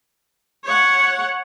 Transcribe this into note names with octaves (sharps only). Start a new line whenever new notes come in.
C#5 F#5